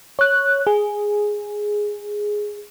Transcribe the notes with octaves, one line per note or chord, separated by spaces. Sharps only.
C#5 F#6
G#4